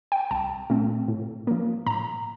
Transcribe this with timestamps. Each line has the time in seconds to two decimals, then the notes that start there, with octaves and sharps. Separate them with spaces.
0.12 G5
0.31 C2 A5
0.70 A#2 A3 C4
1.08 A2
1.47 F3 A#3
1.86 A2 A#5